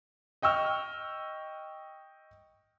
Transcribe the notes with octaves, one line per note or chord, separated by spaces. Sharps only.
D#5 G5 C#6 E6 F6